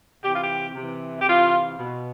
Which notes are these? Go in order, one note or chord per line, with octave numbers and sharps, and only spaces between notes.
C3 E3 G4
F4
G4
C3 E3
G4
C3 E3 F4
B2